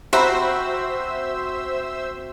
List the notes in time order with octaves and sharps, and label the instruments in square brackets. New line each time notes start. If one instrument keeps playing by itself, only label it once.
[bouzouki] C4 F#4 [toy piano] G4 A#5 B5 [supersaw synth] C5 E5 E6